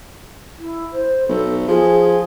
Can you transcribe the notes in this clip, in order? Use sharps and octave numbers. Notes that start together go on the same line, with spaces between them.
E4
C5
B1 A4
F3 G#4